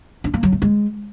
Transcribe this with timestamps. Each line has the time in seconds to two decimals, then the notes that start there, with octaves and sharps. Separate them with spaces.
0.24 D4
0.34 A#3
0.43 F#3
0.52 A3
0.62 G#3